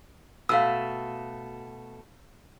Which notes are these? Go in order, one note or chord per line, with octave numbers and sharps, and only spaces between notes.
B2 A3 F5 E6